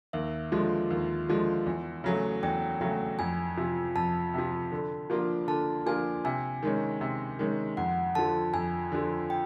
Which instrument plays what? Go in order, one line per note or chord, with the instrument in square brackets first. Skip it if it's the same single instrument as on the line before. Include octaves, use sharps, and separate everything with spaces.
[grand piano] D#2 [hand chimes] E5
[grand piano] D3 F3 G#3
D#2
D3 F3 G#3
E2
C#3 F#3 A3
[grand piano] E2 [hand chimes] G5
[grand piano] C#3 F#3 A3
[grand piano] F2 [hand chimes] G#5
[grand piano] C3 F3
[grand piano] F2 [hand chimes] A5
[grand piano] C3 F3
D3
F3 A#3 D4 F4
[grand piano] D3 [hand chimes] A5
[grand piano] F3 A#3 D4 F4 [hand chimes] G#5
[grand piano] C3 [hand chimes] G#5
[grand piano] D#3 G#3 C#4
C3
D#3 G#3 C#4
[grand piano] F2 [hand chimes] F#5
[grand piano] D3 F3 [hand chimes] A5
[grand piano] F2 [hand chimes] G#5
[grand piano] D3 F3
[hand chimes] G5